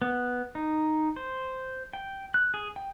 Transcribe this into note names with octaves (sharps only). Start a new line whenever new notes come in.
B3
D#4
C5
G5
F#6
G#4
G5